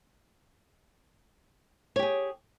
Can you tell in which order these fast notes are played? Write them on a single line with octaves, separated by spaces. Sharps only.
C#5 G4 G#4